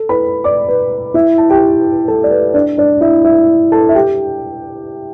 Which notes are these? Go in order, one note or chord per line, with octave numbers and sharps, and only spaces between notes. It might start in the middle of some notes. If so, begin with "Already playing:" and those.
Already playing: A4
B4 B5
D5 D6
B4
E4 E5
A5
G4 G5
A4 A5
D5
B4
D4 D5
D4 D5
E4 E5
E4 E5
A4 A5
E5
G4 G5